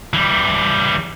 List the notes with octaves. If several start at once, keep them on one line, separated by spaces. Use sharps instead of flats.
E3 G3